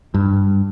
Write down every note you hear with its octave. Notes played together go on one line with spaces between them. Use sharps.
G2